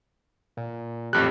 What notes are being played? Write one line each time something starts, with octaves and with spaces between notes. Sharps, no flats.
A#2
A1 F2 G4 F#6